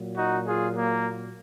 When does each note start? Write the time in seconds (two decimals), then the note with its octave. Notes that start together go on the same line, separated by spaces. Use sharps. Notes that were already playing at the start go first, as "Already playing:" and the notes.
Already playing: A#2 F#3
0.16 D#4 F#4
0.47 F4 G#4
0.77 A#3